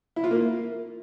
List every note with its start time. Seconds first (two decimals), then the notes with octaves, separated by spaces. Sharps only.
0.16 E4
0.24 F4
0.31 A#3